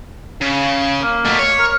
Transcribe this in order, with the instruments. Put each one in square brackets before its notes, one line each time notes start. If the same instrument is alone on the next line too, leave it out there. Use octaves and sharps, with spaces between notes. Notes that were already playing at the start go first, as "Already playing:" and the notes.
[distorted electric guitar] C#3
[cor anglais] A#3
[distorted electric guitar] B2 A3
C#5
[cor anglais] A#4